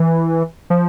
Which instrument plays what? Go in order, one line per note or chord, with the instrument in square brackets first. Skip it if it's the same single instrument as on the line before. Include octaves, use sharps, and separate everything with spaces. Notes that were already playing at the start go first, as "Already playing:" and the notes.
Already playing: [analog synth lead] E3
F3